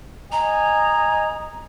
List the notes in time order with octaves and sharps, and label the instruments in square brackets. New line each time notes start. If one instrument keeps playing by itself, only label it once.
[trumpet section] D#5 G#5 [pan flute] A#5